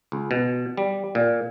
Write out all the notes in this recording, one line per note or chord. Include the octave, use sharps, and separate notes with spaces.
C#2
B2
G3
A#2